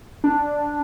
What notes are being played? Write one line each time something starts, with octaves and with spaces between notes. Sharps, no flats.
D4